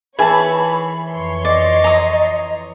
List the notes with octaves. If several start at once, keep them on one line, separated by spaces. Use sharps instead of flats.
E3 G#4 C#5 A5 B5
F2 C#5 C6
D5 D#5
A#5 D#6